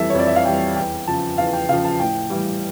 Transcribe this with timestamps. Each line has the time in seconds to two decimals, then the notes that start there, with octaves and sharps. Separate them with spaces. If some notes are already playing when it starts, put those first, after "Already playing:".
Already playing: F2 E3 G3 A4 E5
0.10 C#5
0.15 F2 D5
0.27 E5
0.36 F5
0.45 E3 G3 G5
0.76 E2 G5
1.07 C#3 F3 A5
1.37 E2 F5
1.53 G5
1.69 C#3 F5
1.73 F3
1.85 A5
2.00 A2 G5
2.30 E3 G3